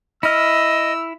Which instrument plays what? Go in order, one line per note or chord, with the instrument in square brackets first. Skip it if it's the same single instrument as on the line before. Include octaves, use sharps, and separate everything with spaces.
[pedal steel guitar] E4 F6 [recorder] D#5 [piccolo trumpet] E6